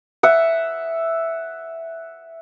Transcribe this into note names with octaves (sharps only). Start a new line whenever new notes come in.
E5 F#5